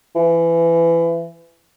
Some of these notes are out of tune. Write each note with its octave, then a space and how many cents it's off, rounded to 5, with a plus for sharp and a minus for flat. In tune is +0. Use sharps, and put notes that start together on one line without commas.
E3 +25